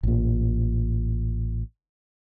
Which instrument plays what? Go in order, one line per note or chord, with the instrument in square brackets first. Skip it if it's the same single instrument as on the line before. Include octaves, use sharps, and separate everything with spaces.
[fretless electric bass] A1 A#2